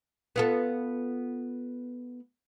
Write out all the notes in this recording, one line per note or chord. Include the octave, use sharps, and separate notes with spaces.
B3 F4 A4